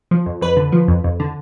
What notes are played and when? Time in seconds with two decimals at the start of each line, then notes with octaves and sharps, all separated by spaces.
0.11 F3
0.26 F2
0.41 F2 B4
0.57 D3
0.72 F3
0.88 F2
1.04 F2
1.20 D3